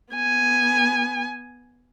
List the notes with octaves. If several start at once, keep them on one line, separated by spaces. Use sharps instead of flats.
B3 G#5